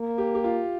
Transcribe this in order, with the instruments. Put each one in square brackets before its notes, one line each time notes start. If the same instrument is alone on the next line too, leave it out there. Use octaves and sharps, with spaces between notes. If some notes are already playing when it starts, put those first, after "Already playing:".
Already playing: [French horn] A#3
[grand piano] G4
G4
F4